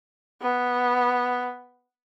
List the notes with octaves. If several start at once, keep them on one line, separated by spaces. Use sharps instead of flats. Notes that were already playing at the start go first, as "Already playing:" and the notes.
B3